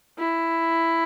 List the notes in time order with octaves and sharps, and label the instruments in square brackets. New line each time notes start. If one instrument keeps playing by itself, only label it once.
[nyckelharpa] E4